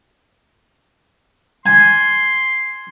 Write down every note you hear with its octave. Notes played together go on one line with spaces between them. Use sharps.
G#5 C6